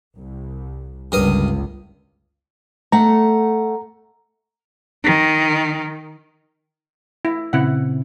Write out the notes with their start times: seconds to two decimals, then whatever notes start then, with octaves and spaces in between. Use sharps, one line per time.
0.16 C2
1.12 G1 C#2 G2 A#4 D#6
2.92 A3 F#5 A#5
5.03 D#3
7.25 E4
7.53 A#2 C#3 C4 E4 F#5